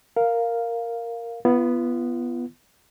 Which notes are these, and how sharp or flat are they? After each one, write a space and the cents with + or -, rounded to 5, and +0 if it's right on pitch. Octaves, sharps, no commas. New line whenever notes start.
A#4 -5 F5 +0
B3 -5 F4 -40